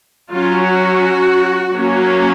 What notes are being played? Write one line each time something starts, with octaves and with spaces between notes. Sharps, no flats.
F#3 C#4 F4
F#4
F#3 A#3 C#4